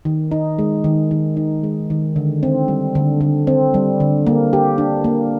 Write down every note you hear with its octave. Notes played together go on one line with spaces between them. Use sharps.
D#3
D#4
G#3
D#3
D#3
D#4
G#3
D#3
D3
C4
G3
D3
D3
C4
G3
D3
A#3
G4
D4
A#3